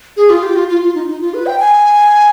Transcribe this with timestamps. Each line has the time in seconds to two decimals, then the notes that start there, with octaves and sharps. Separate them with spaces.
0.17 G#4
0.30 F4
0.43 G4
0.56 F4
0.69 F4
0.82 F4
0.95 D#4
1.07 D#4
1.21 F4
1.34 B4
1.47 G5
1.60 G#5